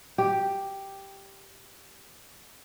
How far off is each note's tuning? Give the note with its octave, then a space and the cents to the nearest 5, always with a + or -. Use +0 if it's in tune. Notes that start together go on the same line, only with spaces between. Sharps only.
G4 +0